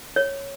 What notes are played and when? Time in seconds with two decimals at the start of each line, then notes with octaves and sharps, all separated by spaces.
0.16 C#5